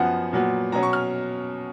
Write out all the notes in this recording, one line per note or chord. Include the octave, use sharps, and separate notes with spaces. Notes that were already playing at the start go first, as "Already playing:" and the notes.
Already playing: F#2 F3 B3 F#5
A#2 F#3 B3
B2 F#3 C#4 A#5
C#6
F6